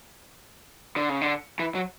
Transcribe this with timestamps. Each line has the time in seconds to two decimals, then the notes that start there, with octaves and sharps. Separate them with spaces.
0.96 D3
1.09 C#3
1.21 D3
1.59 E3
1.75 F#3